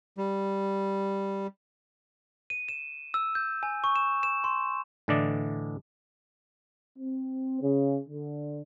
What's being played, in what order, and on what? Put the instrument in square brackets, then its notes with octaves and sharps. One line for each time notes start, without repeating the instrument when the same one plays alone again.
[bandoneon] G3
[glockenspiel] D#7
E7
E6
G6
G#5
C#6
E7
E7
C6
[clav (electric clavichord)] A2 D3 E3 D4 D5 D#5
[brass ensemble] C4
C#3
D3